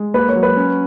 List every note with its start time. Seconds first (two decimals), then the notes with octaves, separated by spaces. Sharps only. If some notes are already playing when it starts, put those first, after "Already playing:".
Already playing: G#3
0.14 A#3 B4
0.29 C#5
0.36 F#3
0.43 B4
0.57 C#4